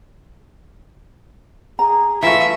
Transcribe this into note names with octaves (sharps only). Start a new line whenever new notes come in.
G#4 A#5
E3 A3 F4 E5